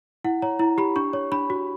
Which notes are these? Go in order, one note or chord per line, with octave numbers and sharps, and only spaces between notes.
E4 F#5
C#5 A#5
E4 A#5
G4 B5
D4 C#6
C#5
D4 B5
F#4